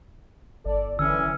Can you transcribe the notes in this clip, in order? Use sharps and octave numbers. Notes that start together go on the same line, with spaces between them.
G1 A4 D5
F#2 D3 E3 C#4 E6